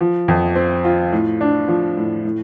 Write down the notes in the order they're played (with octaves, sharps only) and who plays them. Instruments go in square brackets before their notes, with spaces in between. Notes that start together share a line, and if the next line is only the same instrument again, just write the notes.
[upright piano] F3
F2
C4
F4
A2
D4
F3
A2
A2